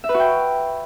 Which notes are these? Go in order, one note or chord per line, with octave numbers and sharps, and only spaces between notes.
E5
B4
F#4
G5